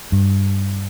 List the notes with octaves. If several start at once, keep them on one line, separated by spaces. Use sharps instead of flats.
G2